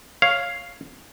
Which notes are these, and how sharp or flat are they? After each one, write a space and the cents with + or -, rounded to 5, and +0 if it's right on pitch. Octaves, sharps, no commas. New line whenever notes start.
C#5 +0 F5 +0